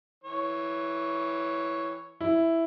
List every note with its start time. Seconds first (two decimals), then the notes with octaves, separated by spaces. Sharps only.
0.24 E3 C#5
2.21 E4